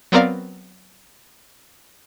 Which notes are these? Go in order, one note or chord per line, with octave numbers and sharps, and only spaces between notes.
F#3 B3 C4 A#4 D5 F5